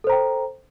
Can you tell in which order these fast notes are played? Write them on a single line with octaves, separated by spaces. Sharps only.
A4 C5 A#5 G5